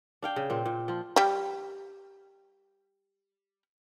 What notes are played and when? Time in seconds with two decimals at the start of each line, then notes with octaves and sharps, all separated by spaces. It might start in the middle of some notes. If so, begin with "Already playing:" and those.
0.22 D4 F5 G5
0.36 C#3
0.50 A#2 C4
0.66 A#2
0.88 F3 F4
1.16 G3 G4